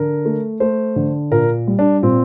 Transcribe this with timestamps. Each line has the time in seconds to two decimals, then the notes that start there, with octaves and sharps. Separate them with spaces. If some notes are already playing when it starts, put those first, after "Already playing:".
Already playing: D3 A#4
0.25 A3
0.60 A3 C5
0.96 D3
1.31 A#2 A#4
1.67 G3
1.79 D4
2.02 A#2 C4